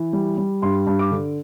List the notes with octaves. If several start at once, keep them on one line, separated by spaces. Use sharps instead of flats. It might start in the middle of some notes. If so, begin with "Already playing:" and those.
Already playing: E3
G3
G3
G2 C6
G2
D6
D3